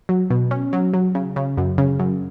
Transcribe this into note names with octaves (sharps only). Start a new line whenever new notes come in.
F#3
B2
C#4
F#3
F#3
C#3
C#3
F#2
C#3
F#2